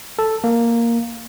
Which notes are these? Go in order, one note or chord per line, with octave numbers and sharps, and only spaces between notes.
A4
A#3